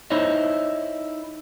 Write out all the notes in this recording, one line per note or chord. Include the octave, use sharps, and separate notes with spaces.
D#4 E4 C5 C#5 D#5